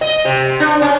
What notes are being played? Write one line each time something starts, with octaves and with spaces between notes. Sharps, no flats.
D#5
C3
D4
C#4